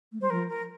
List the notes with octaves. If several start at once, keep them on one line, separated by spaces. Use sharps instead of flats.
A3
G3 C5
F3 A#4
A#4